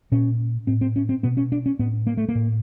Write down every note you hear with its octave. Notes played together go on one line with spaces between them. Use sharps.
A#2 C#4
A2 C4
C4
C#4
C4
B2 B3
C#4
D4
C#4
A2 B3
A#3
A3
A#3
A2